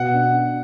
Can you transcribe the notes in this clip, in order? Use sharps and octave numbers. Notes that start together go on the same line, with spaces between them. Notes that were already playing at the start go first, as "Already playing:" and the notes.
Already playing: B2 F#5
D4